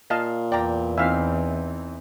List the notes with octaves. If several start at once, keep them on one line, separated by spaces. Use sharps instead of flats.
A#2 D#5 F5 A5
E2 D5 G5 A#5
E3 C4 D#4 E5 F5